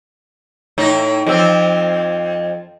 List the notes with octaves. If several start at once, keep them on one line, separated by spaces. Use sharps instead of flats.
A2 D#4
F2 F3 C4